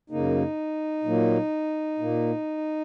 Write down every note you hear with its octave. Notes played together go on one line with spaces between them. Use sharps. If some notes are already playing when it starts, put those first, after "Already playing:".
F#2 C#3 A#3 D#4
A#2 F#3 A#3
A#2 A#3